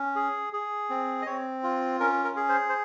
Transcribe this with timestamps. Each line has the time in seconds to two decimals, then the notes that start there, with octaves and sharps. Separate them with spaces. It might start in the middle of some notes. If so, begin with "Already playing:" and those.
Already playing: C#4
0.16 G#4
0.53 G#4
0.90 C4
1.22 D#5
1.26 C4 C#5
1.63 F4
2.00 C#4 A#4
2.24 A#4
2.36 G#4
2.49 C5
2.69 C5